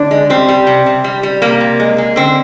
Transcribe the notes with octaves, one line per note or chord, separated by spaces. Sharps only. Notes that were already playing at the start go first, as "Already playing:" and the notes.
Already playing: D3 D4
G#3
G3 C4
G3
C3
C3
G3
G3
C3 A#3
C3
G#3
G#3
D3 C4